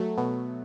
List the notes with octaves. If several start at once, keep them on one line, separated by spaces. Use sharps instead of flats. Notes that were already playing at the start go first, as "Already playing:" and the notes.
Already playing: F#3 A3
B2